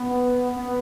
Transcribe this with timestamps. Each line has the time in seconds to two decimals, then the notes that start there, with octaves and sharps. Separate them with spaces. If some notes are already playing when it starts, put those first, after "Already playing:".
Already playing: B3
0.56 B3